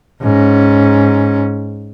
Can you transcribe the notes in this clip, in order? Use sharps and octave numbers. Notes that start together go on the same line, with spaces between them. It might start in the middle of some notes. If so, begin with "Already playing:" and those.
G#2 C#4